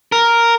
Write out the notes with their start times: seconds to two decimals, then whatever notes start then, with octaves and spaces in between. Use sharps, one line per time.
0.12 A#4